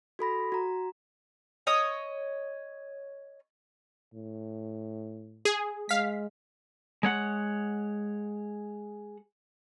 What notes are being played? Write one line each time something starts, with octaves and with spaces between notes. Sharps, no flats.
F#4 A4 B5 A#6
F#4 A#5
C#5 D#5 D#6
A2
G#4
G#3 F5 B6
G#3 C#5 F#5